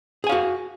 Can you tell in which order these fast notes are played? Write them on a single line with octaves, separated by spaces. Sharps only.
G#4 G#5 F5 F#4